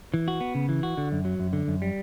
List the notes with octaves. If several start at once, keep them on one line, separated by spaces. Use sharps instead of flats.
E3
F#4
B3
C#3
E3
F#4
D3
F#2
F#3
F#2
D3
F#2
G3